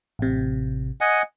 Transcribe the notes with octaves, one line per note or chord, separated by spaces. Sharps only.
A1 C3
D#5 F#5 G#5